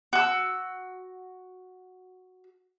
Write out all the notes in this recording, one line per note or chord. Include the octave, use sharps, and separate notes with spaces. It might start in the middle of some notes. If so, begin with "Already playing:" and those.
F#4 E6